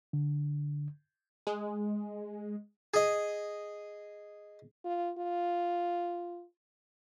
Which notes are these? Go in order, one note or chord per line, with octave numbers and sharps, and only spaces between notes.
D3
G#3
G#4 D#5
F4
F4